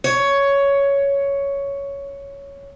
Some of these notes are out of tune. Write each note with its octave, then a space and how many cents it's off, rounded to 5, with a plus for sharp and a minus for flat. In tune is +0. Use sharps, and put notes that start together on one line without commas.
C#5 +10